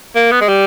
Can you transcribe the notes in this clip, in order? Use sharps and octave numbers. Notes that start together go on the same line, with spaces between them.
A#3
B3
G#3
G3